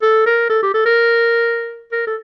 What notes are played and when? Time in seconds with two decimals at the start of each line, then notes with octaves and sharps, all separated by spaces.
0.02 A4
0.26 A#4
0.49 A4
0.62 G4
0.74 A4
0.86 A#4
1.92 A#4
2.07 A4